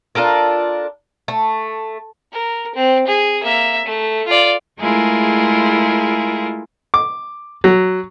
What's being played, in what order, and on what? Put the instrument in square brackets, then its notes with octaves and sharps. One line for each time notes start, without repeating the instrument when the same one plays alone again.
[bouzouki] D4 F4 A4 A#4
A3
[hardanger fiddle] A#4
C4
G#4
A#3 E5
A3
F4 D5
[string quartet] G#3 A3 E4 F4 G#4 A#4
[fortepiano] D6
F#3